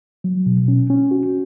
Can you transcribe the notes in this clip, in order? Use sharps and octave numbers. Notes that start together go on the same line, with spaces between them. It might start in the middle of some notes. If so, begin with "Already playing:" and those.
F#3
B2
C#4
C#4
F#4